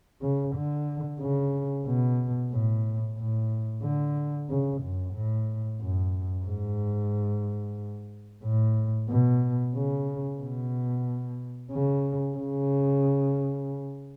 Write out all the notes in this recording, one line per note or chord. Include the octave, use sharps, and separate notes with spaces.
C#3
D3
C#3
B2
A2
A2
D3
C#3
F#2
A2
F#2
G#2
A2
B2
C#3
B2
C#3
C#3